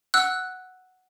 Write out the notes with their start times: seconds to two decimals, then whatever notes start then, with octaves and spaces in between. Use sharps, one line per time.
0.14 F#5 E6 F#6